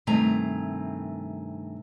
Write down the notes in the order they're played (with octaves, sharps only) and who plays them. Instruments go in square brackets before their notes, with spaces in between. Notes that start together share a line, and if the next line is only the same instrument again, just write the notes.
[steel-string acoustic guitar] G2 C3 D#3 A3 G#5 A#5